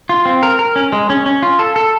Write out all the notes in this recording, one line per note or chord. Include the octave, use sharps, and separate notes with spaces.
F4
C4
A#4
A#4
C#4
G#3
C#4
C#4
F4
A4
A4